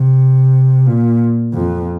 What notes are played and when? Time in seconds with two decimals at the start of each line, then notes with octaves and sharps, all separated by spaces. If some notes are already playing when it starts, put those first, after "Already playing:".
Already playing: C3
0.87 A#2
1.54 F2